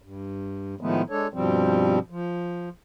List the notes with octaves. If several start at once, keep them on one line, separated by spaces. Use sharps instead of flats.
G2
A2 D#3 F3 G#3 A3 B3
G#3 D4 A4 C#5
G2 B2 F3 G3 C4
F3